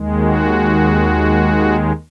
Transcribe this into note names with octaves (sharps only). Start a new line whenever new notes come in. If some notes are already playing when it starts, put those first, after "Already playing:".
Already playing: D#2 D#3 G#3
F#4